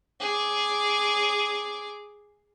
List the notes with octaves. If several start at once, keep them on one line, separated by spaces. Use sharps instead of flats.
G#4 D6